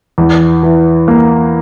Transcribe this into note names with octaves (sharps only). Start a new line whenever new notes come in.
E2
E3
A#3